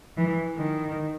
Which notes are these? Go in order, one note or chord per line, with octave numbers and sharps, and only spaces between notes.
E3
D#3